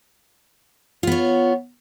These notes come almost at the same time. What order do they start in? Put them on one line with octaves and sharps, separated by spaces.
F4 B3 C#5